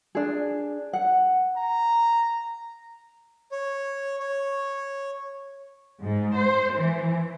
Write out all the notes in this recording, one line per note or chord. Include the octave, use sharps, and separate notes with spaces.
D4 G#4
F#5
A#5
C#5
C#5
G#2
C5
E3